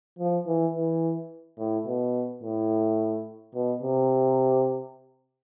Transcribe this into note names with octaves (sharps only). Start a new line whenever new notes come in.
F3
E3
E3
A2
B2
A2
B2
C3